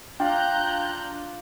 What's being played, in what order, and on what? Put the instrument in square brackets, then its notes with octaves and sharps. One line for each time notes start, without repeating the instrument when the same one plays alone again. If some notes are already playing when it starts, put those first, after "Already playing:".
[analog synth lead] D4 [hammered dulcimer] F4 D5 [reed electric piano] F5 G5 [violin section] A#5 F#6 G6